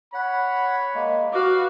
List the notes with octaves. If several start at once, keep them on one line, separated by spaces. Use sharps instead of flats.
C#5 F#5 B5
G#3 A#3
F#4 B4 F5 D6